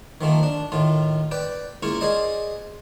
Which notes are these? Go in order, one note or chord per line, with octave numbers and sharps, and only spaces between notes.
D#3 F3 A3 A#3
D4
A2 D#3 F4
B4 D5 G5
C#2 A#3 E4 F4 C#6
G#4 C5 D5 D#5